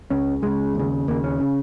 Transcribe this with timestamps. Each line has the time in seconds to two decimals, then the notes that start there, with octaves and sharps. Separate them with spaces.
0.10 C#2 C#3 C#4
0.42 C#2 C#3 G#3
0.75 D#2 C#3
1.08 D#2 C#3 A#3
1.24 C#4
1.40 C#3